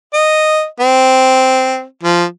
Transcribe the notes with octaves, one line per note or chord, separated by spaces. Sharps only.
D#5
C4
F3